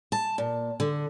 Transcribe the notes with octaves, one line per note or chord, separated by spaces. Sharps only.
A5
A#2
D3